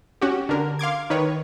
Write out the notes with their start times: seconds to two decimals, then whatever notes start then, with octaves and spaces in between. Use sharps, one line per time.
0.21 C#4 F#4 G4
0.49 D3 A#4
0.79 F5 C6 D6 G#6
1.10 D#3 B4 C#5